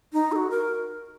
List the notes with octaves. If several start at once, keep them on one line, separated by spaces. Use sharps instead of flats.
D#4
A4
F#4
A#4